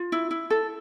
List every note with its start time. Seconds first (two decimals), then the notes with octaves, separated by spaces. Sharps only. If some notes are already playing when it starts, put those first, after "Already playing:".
Already playing: F4
0.12 E4
0.31 E4
0.50 A4